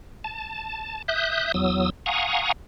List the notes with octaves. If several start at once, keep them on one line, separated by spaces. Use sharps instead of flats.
A5
E5 D#6 F#6 G6
E2 F#3 D#6 E6
F5 F#5 G#5 A#5 C#6 D#6